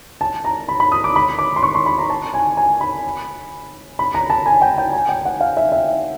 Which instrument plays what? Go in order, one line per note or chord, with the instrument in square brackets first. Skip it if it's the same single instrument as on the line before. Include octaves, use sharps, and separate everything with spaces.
[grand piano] A5
A#5
B5
B5
D#6
D6
B5
D6
C6
C#6
C6
B5
A#5
A5
G#5
G#5
B5
B5
A#5
A5
G#5
G5
G5
G#5
G5
F#5
F5
E5
E5